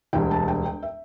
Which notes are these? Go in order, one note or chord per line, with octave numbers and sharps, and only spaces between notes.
E1 D2 D3 G3 G5
A5
G5
G5
E5